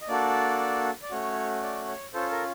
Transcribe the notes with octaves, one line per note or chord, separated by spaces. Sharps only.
D#5
A#3 D4 F#4 A4 D5
D5
A3 C#4 F#4 C#5
D5
C#5
C#4 F4 A4 C5
A#4